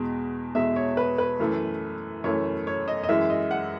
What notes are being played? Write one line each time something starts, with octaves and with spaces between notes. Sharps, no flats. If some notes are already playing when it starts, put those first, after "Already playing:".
Already playing: E2 B2 G#3
E2 B2 G#3 E5
C#5
B4
B4
F#2 E3 A3
F#2 E3 A3 C#5
C#5
D#5
D#5
F#2 E3 G#3 E5
D#5
F#5